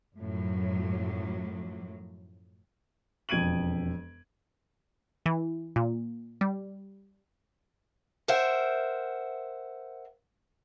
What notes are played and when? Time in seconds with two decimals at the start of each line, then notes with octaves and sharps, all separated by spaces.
0.18 F#2 A2 F3 F#3
3.29 E1 F2 G#6 D7 D#7 F#7
5.26 E3
5.76 A#2
6.41 G3
8.28 A#4 C5 E5 F#5 G5